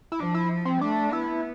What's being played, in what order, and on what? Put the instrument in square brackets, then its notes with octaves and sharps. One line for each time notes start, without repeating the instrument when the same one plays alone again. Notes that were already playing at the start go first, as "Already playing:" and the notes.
[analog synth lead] E4
[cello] F3 [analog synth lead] D4
[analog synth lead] E4
C4
[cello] A3 [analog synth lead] D4
[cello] B3 [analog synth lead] E4